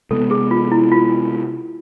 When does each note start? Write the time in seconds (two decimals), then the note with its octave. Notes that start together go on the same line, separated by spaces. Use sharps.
0.11 C3 G#3 B3 A4
0.31 G#4
0.51 F4
0.72 E4
0.92 F4